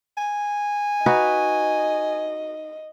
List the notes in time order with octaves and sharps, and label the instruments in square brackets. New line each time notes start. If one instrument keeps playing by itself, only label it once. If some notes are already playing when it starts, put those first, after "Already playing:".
[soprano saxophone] G#5
[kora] D#4 F#4 B4 [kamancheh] D#5